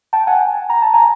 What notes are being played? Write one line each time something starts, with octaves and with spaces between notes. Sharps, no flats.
G5 A5
F#5 G#5
A#5
A5
G#5 A#5